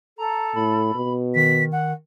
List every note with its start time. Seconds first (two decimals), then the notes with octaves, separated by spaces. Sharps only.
0.18 A4 A#5
0.56 A2 B5
0.95 B2
1.35 D#3 B6
1.72 F#5